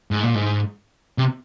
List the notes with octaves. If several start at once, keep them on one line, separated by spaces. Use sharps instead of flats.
G#2
A#2
G#2
C3